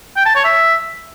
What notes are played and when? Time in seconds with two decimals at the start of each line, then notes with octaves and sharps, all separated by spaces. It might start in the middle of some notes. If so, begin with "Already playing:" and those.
0.16 G5
0.26 A5
0.35 C#5
0.45 E5